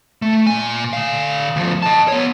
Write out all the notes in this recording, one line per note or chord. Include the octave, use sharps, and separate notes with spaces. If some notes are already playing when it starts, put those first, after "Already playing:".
A3
A#2 G#5
D3 F5
D2 F3
D#5 A5
B3 C#5